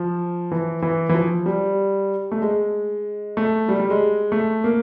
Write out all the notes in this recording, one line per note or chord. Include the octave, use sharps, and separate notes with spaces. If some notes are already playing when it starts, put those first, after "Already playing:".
Already playing: F3
E3
E3
E3
F3
G3
A3
G#3
A3
G3
G3
G#3
A3
A#3